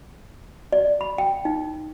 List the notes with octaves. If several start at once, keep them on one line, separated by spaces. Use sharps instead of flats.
D5
B5
G5
D#4